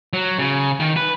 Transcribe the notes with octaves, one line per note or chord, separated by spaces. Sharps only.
F#3
C#3
D#3
B4